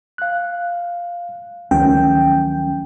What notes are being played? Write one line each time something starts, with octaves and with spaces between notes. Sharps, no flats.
F5 F#6
D2 D#3 F3 F#3 C#4 G5